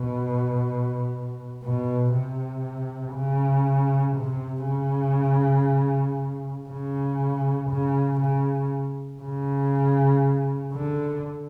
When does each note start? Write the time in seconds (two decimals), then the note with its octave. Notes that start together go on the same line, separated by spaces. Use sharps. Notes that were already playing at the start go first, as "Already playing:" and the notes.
Already playing: B2
1.64 B2
2.14 C3
3.15 C#3
4.17 C3
4.67 C#3
6.70 C#3
7.70 C#3
8.21 C#3
9.22 C#3
10.74 D3